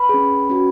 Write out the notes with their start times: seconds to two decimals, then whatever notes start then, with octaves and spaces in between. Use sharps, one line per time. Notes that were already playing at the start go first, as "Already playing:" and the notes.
Already playing: B4 B5
0.09 C#4 G#4
0.49 C#4 F#4